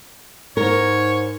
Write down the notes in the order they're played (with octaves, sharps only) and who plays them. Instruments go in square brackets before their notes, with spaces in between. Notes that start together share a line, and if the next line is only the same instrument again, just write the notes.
[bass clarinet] G#2 [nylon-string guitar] A#4 [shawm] C#5